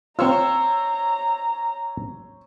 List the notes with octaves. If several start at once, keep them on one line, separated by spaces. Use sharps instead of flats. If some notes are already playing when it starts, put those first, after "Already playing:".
C4 F4 C5 C#5 A#5 E6